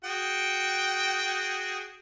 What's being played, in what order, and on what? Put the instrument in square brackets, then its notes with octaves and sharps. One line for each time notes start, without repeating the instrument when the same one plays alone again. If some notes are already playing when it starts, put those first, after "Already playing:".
[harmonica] F#4 G#4 G5